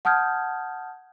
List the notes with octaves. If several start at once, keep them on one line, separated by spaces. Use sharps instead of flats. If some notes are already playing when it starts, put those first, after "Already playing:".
F#5 A5 D#6 F6 G6 G#6